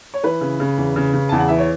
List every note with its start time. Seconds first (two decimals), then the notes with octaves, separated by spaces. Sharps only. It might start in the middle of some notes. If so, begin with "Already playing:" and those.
0.14 C#5
0.23 E3 B4
0.41 C#3
0.60 C#3
0.78 E2
0.96 C#3
1.13 C#3
1.29 E2 A5
1.38 F#5
1.48 E3 E5
1.58 C#5